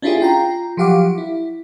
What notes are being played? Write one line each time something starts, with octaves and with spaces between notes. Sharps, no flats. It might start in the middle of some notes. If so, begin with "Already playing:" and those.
C#4 D4 E4 F4 G4 G#4
F4 G5 A#5
F3 F#3 G4 F5 F#5 D6
E4